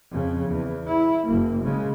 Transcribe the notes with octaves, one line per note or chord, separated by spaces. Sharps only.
F2 C#3
E2
E4
F#1 A#3
C#3 G#3